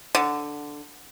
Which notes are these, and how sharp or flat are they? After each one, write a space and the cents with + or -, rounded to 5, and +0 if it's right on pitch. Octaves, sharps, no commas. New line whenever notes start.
D3 +0